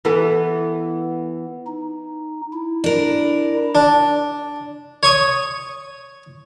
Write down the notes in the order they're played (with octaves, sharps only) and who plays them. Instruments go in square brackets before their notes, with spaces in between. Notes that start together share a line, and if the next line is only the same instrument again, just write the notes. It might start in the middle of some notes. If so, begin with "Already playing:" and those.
[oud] E3 B3 A4
[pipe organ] D#4
E4
[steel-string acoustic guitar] D4 A#4
[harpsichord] D4
C#5 C#6 D#6